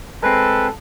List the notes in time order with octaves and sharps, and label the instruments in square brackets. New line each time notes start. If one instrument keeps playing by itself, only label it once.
[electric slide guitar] G#3 C4 [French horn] A4 [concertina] B4